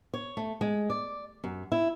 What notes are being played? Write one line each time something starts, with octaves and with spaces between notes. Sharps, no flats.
C#5
A3
G#3
D5
F#2
E4